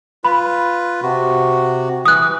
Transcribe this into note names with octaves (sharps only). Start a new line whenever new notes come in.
F4 B4 B5
C3 F#4
E3 D#6 F#6